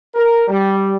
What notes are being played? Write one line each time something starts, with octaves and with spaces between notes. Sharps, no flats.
A#4
G3